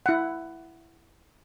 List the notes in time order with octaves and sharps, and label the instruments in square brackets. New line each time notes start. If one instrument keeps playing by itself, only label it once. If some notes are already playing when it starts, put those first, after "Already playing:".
[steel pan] E4 F#5